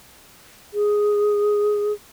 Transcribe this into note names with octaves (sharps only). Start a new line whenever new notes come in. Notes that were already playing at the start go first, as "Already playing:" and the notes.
G#4